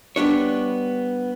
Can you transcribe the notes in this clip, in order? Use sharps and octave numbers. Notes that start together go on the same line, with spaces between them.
G3 B3 D4 C#5